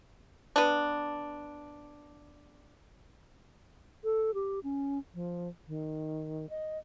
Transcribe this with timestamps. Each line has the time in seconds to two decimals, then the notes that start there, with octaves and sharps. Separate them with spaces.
0.56 B3 D4
4.04 A4
4.34 G4
4.63 C#4
5.14 F3
5.68 D#3
6.50 D#5